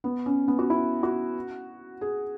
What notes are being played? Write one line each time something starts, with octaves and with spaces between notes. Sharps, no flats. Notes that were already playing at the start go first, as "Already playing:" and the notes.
B3
C#4
B3
F#4
E4
F#4
G#4